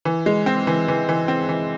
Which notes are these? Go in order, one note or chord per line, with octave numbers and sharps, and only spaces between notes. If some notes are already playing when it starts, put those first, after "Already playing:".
E3
G#3
C4
E3
E3
E3
C4
E3